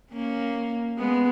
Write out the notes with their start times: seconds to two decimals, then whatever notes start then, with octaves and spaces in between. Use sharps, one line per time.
0.12 A#3 C#4
0.98 G#3 B3